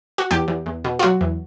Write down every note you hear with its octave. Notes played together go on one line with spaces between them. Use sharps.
F#4
E2 G4
E2
E2
B2
F4
F#3 F#4
E2